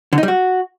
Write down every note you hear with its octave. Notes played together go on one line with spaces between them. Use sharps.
D3
D#4
G3
F#4